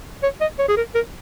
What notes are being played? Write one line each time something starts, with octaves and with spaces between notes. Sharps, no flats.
C#5
D#5
C#5
G#4
A#4
A#4